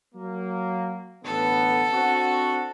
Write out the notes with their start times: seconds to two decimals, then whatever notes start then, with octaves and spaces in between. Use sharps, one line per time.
0.15 F#3 A#3
1.24 A1 D3 B3 A4
1.92 C4 D4 F#4